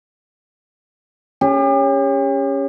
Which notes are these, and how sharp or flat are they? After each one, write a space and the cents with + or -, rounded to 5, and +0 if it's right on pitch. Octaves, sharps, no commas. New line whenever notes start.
C#4 +0 G4 +40